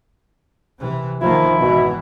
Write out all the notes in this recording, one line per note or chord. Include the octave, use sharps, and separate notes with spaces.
C3 E3
D#3 F3 A#3 E4
G#1 B2 E3